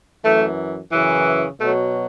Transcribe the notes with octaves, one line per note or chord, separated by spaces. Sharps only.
F#2 E3 A3
F#2 C#3 E3
B2 F#3 A3